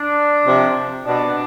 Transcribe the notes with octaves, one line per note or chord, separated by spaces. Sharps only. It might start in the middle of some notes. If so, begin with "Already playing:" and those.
Already playing: D4
C3 F3
B2 D4